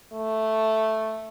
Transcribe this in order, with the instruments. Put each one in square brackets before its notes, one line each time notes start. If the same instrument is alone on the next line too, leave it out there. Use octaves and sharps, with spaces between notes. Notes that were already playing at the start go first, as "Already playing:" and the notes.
[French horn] A3